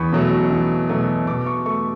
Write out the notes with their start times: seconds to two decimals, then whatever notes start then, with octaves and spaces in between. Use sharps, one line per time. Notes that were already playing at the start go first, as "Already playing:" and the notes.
Already playing: E2 B5 C#6
0.12 B2 F#3 A3
0.50 E2
0.89 B2 F#3 A3
1.27 B2 D6
1.46 C#6
1.66 A3 C#6